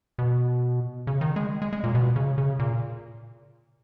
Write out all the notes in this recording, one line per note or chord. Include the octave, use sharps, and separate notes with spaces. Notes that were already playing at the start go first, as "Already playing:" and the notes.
B2
C#3
D#3
G#3
G#3
G#3
A#2
B2
C#3
C#3
A#2